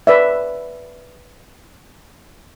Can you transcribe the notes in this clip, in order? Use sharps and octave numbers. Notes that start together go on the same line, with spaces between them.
B4 D5 E5